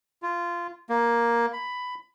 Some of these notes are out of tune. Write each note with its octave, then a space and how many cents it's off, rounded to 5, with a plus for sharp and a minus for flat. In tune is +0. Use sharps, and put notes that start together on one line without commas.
F4 -15
A#3 +10
B5 +10